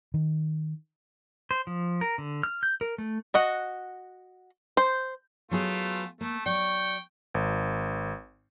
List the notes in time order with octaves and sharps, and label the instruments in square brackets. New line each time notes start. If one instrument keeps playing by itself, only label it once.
[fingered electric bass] D#3
[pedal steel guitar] C5
F3
A#4
D3
F6
G6
A#4
A3
[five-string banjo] F#4 D#5 F#5
C5
[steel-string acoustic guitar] F#3 B3 G#4 [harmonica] A3 F4
[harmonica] A3 [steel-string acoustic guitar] A#3
[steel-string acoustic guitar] F#3 D5 [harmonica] G5 C#6
[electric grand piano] G#1